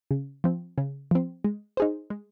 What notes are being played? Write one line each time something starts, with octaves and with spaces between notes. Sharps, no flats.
C#3
F3 C4
C#3
F3 C4
G#3
D#4 G#4 C5
G#3